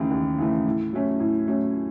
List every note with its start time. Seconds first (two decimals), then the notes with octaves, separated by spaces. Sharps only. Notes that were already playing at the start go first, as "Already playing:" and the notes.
Already playing: D#2 C#3 E3 A3
0.11 D#2
0.38 C#3 E3 A3
0.66 A2
0.93 F#3 A3 C#4
1.20 A2
1.47 F#3 A3 C#4